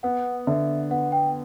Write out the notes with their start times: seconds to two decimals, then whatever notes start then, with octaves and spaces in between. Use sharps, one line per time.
0.03 B3 F#5
0.47 D3 E5
0.91 B3 F#5
1.12 G5